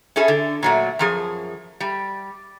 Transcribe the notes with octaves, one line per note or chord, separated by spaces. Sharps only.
C#4 E4 G#4 A4
D3
A#2 F#3 A3
F#2 F3 G#4
G3